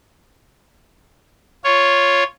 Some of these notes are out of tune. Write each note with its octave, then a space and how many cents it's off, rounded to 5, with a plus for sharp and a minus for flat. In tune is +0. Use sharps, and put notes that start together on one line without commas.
F4 +0 C#5 +0